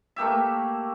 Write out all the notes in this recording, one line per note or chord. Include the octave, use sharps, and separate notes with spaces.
A3 A#3 G4 E5